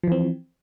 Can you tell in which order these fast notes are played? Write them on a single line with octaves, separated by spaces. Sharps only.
F3 E3 C4